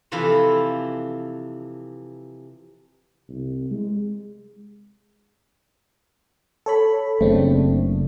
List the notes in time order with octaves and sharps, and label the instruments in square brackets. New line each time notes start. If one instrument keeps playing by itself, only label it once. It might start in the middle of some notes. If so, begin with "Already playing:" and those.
[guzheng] C3 E3 F3 E4 F4 A4
[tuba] C2
G#3
[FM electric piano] A4 C#5 B5
[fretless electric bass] F#1 A3 [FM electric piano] C#3 C4 D4